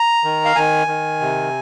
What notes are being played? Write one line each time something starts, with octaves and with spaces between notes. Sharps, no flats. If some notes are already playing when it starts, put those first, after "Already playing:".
Already playing: A#5
D#3
F5
D#3 G#5
D#3
C3